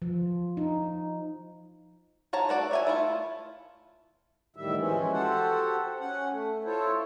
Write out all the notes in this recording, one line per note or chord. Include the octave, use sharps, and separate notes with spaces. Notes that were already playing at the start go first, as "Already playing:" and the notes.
F3
D#4
F3 C#5 A5 A#5
A3 F#4 D5
C#5 E5 G#5
A3 E4 F4
E2 A2 D#3 G3 E5
E3 F3 G#3 C#4
F#4 G4 A4 C5 F#5
C#4 F#5
A3
E4 F4 A4 C5 C#5